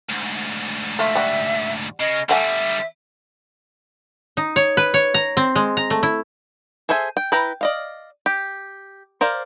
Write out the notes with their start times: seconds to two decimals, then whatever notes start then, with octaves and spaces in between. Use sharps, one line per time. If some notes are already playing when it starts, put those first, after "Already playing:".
0.10 D2 G#2
0.99 A3 F4 E5
1.15 G3 F#4
2.00 C#3 D#5
2.29 D3 G3 A3 E5 F#5 G#5
4.37 D#4
4.56 C#5
4.77 B4
4.94 C#5
5.14 A#5
5.37 C4
5.55 G#3
5.77 A#5
5.90 A3
6.03 E4
6.89 G#4 A4 C5 E5 G#5
7.17 G5
7.32 E4 B4 G5 A#5
7.61 D5 D#5 F5
8.26 G4
9.21 A#4 C5 D5 F5